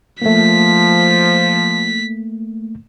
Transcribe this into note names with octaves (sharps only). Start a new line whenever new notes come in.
F3 A3 A#3 B6